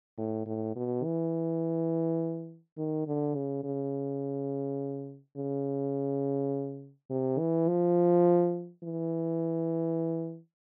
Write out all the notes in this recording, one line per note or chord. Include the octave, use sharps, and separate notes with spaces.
A2
A2
B2
E3
D#3
D3
C#3
C#3
C#3
C3
E3
F3
E3